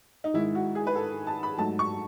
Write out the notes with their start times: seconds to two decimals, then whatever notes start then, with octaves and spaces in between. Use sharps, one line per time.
0.24 D#4
0.34 G#2 D#3 G#3 E4
0.55 F#4
0.75 G#4
0.87 B4
0.95 A4
1.27 A5
1.43 B5
1.58 G#2 F#3 A3 A5
1.79 C#6